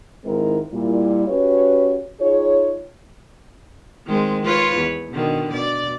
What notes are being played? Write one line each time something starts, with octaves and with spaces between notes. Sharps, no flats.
G#2 D#3 G#3 C4 E4 A#4
A#2 G3 E4
C#4 F#4 G4 B4 C#5
D#4 F4 G#4 C#5
D#3 G#3 C4
F4 B4 C#5
E2
B2 D3 D#3
B2 D5